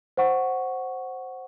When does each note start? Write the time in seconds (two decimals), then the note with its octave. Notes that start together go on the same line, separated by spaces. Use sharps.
0.17 C5 F#5 C#6